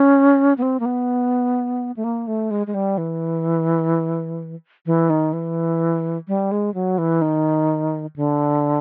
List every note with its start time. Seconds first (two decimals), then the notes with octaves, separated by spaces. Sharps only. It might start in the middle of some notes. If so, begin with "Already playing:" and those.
Already playing: C#4
0.58 B3
0.62 C4
0.80 A#3
0.86 B3
1.97 A3
2.04 A#3
2.27 A3
2.51 G#3
2.67 G#3
2.74 G3
2.98 E3
4.86 E3
5.10 D#3
5.33 E3
6.28 G3
6.52 G#3
6.74 F#3
6.98 E3
7.22 D#3
8.16 D3